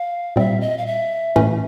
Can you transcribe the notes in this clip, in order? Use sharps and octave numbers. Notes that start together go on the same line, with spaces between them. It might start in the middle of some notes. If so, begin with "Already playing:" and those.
Already playing: F5
A#2 G3 C4 E5
D#5
F5
E5
A2 E3 A3 C#4